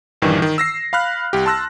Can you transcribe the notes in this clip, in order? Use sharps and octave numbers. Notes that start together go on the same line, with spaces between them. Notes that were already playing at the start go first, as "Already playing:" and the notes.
A#1 G2 D#3 E3
D#3
E6 A#6 C7
F5 B5 F6 F#6
C2 G4
A5 C6 E6 F#6 A#6